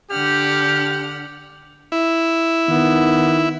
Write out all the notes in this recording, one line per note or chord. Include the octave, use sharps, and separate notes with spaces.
D3 G4 F#5 F6
E4
D#3 B3